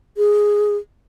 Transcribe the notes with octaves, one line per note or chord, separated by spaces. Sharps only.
G#4